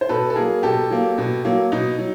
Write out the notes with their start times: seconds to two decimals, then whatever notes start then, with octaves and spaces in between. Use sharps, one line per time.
0.01 C5
0.09 B2 A4 B4
0.30 A4
0.36 F#3 A#3 G#4 A#4
0.63 B2 G4 A4
0.90 F#3 A#3
1.18 B2
1.45 F#3 A#3
1.72 B2 D#4
1.99 F#3